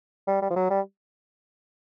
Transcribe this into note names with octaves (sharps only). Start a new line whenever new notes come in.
G3
G3
F3
F#3
G3